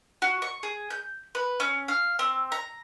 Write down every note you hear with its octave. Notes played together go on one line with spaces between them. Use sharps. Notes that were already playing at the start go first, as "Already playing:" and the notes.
F#4
C#6
G#4
G6
B4
C#4
F5
C4
A#5